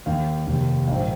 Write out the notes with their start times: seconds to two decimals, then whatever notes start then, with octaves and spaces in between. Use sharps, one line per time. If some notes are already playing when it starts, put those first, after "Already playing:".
0.06 D#2 D#3 F5
0.47 F1 D#2 D#3
0.87 A#1 G#2 D#3 F5